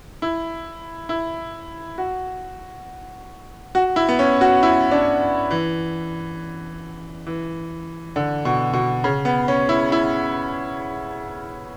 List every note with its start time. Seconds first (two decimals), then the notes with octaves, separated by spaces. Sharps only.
0.22 E4
1.09 E4
1.98 F#4
3.75 F#4
3.96 E4
4.09 B3
4.19 C#4
4.41 F#4
4.63 E4
4.91 D4
5.51 E3
7.27 E3
8.16 D3
8.45 B2
8.73 B2
9.04 C#3
9.25 B3
9.48 C#4
9.69 E4
9.92 E4